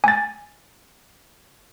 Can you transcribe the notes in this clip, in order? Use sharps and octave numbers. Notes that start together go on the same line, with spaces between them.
G#5 A6